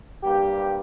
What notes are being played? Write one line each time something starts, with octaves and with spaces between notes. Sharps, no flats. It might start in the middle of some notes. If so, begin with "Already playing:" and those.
G2 G3 A#3 G4